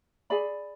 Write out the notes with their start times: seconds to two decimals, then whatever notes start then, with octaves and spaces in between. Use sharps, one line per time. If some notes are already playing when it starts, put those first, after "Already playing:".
0.30 G#4 D5 G#5 B5